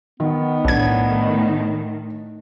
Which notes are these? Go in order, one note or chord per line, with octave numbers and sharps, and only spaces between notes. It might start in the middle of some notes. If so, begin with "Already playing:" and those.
D#3 B3
B1 A2 D#3 D4 G#6